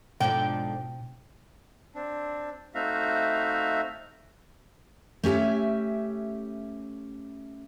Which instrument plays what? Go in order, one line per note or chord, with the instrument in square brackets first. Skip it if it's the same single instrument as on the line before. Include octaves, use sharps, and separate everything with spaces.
[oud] G#2 D3 F3 [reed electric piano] B2 [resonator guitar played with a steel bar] G5
[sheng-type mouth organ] C4 D4
A3 C4 D#4 F#4 E5 F5
[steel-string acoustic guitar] A3 C#4 G4 E5 G#5